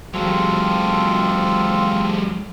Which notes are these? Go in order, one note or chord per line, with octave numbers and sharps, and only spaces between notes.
F#3 G#3 C4 F4 A4